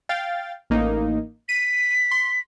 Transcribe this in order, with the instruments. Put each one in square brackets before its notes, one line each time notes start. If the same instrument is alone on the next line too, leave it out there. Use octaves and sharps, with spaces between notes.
[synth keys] F5 G5 A6
A1 A#3 D#4
[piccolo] B6 [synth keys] D#7
[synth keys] C6